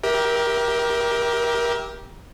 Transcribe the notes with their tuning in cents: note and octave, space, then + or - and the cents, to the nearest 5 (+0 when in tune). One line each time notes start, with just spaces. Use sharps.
G4 +0 A#4 +25 E5 -20